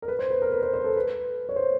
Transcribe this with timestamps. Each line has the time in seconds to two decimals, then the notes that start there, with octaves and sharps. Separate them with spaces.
0.02 A#4
0.08 B4
0.19 C5
0.30 B4
0.42 A#4
0.52 B4
0.62 C5
0.73 C5
0.84 A4
0.97 B4
1.49 C#5
1.56 C5